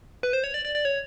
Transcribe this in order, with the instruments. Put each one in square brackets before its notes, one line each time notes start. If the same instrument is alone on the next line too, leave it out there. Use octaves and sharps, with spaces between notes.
[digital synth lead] B4
C5
C#5
D5
D5
D5
C#5